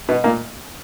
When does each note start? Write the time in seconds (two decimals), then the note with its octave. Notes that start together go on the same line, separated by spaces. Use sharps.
0.09 B2 B3
0.24 A#2 A#3